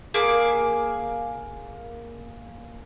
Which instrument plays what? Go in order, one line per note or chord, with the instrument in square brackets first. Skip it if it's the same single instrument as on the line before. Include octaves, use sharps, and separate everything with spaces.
[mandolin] A#3 G#4 D6